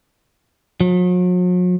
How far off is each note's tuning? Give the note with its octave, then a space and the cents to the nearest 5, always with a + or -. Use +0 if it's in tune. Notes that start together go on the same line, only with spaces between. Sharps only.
F#3 -45